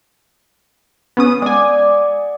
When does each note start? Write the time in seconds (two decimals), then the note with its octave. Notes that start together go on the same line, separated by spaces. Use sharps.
1.17 B3 C#4 G#4 D#6
1.42 G#3 D5 F#5 G#5